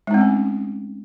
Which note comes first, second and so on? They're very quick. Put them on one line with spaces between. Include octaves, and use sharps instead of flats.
G#3 D#4 C4 A3 C#4